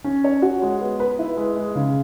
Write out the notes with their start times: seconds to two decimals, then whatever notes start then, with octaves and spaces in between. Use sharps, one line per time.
0.04 C#4
0.24 C#5
0.42 F#4
0.62 G#3
0.81 B3
1.00 B4
1.19 E4
1.37 G#3
1.56 G#3
1.75 C#3